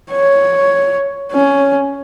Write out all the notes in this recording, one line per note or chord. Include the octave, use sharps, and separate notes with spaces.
C#5
C#4